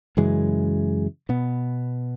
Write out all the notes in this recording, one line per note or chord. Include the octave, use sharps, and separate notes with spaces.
F#2 C#3 E3 G#3
B2 B3